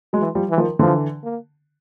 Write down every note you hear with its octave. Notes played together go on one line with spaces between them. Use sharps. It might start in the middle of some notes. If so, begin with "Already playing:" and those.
F#3 G#3
E3
F3 G3
E3
D#3 F3
D3 E3 F3
A#3